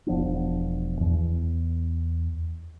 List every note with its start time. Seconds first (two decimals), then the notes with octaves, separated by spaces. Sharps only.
0.07 E1 F3 B3 D4
1.01 E2